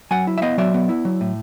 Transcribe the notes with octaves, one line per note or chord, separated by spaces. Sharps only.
F#3 F#5 G#5
E4
E5
B3 D#5 F5
F#3 D5 E5
B3
E4
F#3
A2